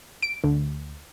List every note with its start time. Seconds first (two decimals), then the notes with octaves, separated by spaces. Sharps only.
0.22 D7
0.44 D2